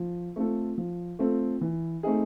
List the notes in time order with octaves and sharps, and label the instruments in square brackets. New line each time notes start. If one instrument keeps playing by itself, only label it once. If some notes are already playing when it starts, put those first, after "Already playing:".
Already playing: [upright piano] F3
A3 C4 F4 A4
F3
A3 C4 F4 A4
E3
A3 C4 D#4 G#4